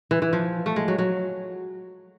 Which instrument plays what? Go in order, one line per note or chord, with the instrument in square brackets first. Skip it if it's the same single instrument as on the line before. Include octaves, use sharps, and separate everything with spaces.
[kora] E3
E3
F3
A3
G#3
F#3
F#3